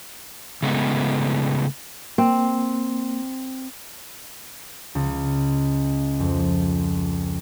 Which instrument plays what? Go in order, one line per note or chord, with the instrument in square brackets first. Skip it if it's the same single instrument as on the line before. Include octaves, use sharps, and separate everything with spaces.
[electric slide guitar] C#3 G#3 A3 B3
[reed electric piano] A#3 [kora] C4
[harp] C#2
F2